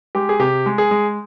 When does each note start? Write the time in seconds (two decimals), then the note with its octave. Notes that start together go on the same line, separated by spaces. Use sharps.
0.15 G#3 G4
0.29 G#4
0.39 C3 G4
0.66 G#3
0.78 G#4
0.91 G#3